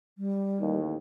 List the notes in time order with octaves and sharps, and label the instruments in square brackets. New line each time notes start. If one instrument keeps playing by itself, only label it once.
[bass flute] G3
[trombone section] A1 D#2